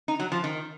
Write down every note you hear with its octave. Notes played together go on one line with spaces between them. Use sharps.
D#4
F#3
F3
D#3